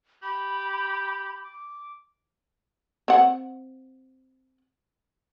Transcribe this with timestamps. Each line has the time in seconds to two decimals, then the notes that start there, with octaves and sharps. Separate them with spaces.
0.23 G4 B5
1.44 D6
3.08 C4 F#5